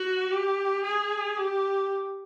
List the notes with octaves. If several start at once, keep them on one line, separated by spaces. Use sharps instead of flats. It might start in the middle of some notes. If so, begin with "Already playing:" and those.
Already playing: F#4
G4
G#4
G4